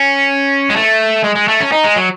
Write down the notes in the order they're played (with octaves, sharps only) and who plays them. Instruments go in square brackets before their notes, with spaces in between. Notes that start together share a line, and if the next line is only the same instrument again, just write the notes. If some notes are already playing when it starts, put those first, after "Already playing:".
Already playing: [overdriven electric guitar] C#4
G#3
A3
G#3
G#3
A3
C#4
D#4
G#3
F#3